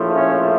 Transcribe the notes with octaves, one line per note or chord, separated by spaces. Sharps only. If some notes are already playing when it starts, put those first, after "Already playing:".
Already playing: A#1 A2 F3 A3
C#4